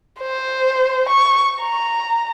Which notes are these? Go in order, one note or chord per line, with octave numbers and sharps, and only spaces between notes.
C5
C#6
A#5